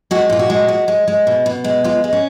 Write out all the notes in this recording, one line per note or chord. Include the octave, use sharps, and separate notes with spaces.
G#3 F#4
A#2 F4
F#4
G#3
G#3
G#3
G#3
B2
B2
G#3
G#3 F4
G#3
C#4